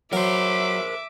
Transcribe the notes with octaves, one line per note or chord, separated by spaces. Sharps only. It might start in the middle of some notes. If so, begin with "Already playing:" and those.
F#3 A#4 C5 E5 D6